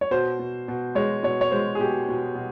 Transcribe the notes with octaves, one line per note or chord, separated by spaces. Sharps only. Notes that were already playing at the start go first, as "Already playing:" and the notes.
C#5
B2 C5
B2
B2
G#3 C#5
B2 C#5
C#5
G#3 C5
G#4
B2 G4
B2
B2